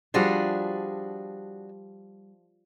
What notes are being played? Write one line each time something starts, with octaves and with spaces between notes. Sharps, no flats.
F3 G3 D4 F#4 G#4